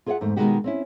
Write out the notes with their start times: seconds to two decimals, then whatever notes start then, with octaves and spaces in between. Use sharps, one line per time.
0.06 F4 G#4 C#5 D5 E5 F#5
0.21 E2 G#2 A3 C5
0.36 B2 D#3 E3 G#3 F#4 G4
0.64 C4 C#4 E4